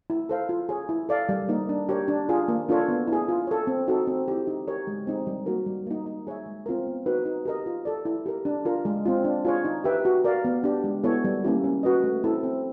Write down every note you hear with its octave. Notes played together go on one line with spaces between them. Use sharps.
E4
A4 C5 F5
F4
G#4 C#5
E4
A4 D5 F5
G3
A#3 D#4
D4
G4 A#4 C#5
D4
F4 G#4
A#3
D4 F4 A4 C#5
B3
E4 G#4
F4
A4 C#5
C4
D#4 F#4 A4
C4
E4 G4
D#4
G4 A#4 C#5
G#3
C4 D#4 G#4
G3
A#3 D#4 F#4 A#4
G3
A#3 D#4
D#4
G#4 C#5 E5
G#3
C4 F4 A#4
B3
D#4 F#4 B4
D#4
G4 A#4 D#5
F4
A4 D5
E4
G4 A#4
D4
F4 A#4
G#3
C4 F4
D4
F4 G#4 C#5
D#4
G4 B4 E5 G5
F#4
A#4 D5 F5
B3
D4 G4
G#3
B3 E4 A4 C#5
G3
A#3 C#4 E4 G4
C#4
F#4 B4 D#5
A3
C4 E4 A4
C4